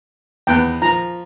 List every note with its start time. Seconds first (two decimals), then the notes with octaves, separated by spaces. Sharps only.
0.47 E2 B3 G5 F#6
0.82 F3 A#5